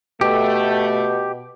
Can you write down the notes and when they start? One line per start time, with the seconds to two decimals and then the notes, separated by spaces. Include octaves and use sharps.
0.21 B2 A3 G4